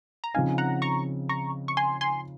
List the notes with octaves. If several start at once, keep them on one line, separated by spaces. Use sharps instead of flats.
A#5
C#3 F3 C4 D#4 F5 G#5
F#5 A#5
A#5 C#6
A#5 C#6
C#6
G#5 C6
G#5 C6